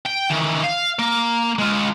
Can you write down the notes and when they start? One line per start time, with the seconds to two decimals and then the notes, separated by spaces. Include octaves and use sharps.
0.05 G5
0.30 D#3 E3
0.63 F5
0.99 A#3
1.59 G#3 F4